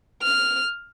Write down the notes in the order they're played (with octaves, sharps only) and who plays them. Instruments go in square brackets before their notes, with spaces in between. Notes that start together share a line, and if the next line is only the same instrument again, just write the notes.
[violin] F6